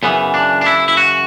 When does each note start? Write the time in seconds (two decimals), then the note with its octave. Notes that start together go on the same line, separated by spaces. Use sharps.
0.03 F#2 C#3 E3 B3
0.34 D4
0.61 D4
0.66 E4
0.88 E4
0.97 F#4